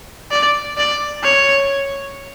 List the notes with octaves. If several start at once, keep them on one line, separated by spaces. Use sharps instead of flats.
D5
D5
C#5